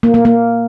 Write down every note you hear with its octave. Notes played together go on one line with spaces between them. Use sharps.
A#3
A#3
A#3